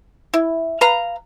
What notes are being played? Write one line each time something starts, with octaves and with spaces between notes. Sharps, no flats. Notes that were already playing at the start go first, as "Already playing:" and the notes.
E4
B4 F5 A#5